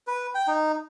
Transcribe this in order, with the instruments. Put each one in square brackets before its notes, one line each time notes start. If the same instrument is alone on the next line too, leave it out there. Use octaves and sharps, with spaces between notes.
[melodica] B4
G5
D#4